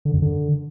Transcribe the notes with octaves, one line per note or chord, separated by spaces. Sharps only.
D3
F#2
D3